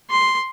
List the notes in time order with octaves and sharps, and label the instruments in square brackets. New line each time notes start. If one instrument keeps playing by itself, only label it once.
[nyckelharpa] C6